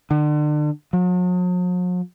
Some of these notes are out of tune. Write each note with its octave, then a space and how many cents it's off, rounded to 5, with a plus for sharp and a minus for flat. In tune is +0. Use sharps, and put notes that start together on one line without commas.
D3 +35
F#3 -45